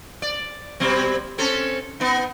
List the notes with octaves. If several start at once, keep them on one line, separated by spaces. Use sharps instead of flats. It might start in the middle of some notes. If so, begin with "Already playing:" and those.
D5
B2 G3 C4
C4 C#4 A4
B3 D#4